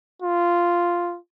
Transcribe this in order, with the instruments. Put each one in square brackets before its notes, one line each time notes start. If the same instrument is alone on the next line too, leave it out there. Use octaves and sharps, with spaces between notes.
[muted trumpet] F4